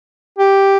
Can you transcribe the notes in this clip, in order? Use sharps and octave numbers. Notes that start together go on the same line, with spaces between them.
G4